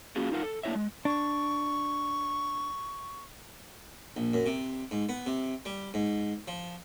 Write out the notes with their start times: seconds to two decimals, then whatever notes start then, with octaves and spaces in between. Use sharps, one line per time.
0.16 A#3 C#4 F4 F#4 G#4
0.32 D#4 F4 A#4 F5 F#5
0.43 A4
0.63 A#3 D4 E4 C#5 E5
0.75 G#3
1.05 D4 C#6
4.17 A#1
4.34 F#2
4.46 C3
4.91 G#2
5.09 B3
5.27 C3
5.65 G3
5.94 G#2
6.48 F3